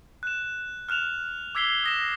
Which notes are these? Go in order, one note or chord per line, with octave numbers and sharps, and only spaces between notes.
F#6 E7
F6 F#6 E7 F7
D6 E6 G#6 B6 C7 G7
D#6 A#6 E7